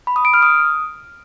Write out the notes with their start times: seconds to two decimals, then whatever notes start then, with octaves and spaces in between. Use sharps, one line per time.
0.07 B5
0.16 D#6
0.25 D7
0.34 F6
0.42 D#6